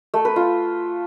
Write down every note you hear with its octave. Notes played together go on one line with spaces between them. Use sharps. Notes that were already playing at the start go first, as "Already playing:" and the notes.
A3
B4
F4